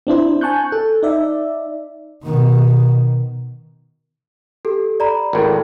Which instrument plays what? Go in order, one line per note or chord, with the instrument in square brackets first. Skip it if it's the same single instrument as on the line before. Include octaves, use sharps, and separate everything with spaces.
[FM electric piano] C4 D4 E4 C5
G#5 A5 C#6 F#6 G6
A4
D#4 D5 E5
[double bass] B2 D#3
[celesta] G4 A4
D5 A#5 B5
[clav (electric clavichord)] G#1 A2